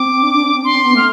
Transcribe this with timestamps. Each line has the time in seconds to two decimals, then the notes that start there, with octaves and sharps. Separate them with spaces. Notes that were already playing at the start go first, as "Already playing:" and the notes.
Already playing: C4 D6
0.23 D4
0.34 D4
0.44 C4
0.54 C4
0.64 D4 C6
0.75 C4
0.85 B3
0.95 A3 F6